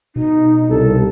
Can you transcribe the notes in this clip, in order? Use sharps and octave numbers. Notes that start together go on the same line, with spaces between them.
B2 D#4
C2 A4